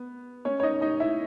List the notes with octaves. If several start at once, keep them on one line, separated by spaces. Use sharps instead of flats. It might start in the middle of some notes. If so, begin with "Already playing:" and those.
Already playing: B3
C#4 C#5
C#5
D#4 D#5
D#4 D#5
E4 E5